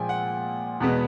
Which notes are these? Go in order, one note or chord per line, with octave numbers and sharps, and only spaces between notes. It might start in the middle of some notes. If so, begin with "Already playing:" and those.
Already playing: A#2 F3 G#3 G5 G#5
F#5
E2 B2 G#3 B3